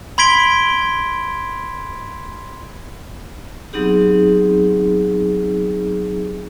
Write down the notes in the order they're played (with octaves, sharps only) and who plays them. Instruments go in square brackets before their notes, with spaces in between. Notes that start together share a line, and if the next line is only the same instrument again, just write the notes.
[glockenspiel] B5 C6 G#6 B6 D7 G7
[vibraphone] F#3 B3 C4 D#4 G4 G#4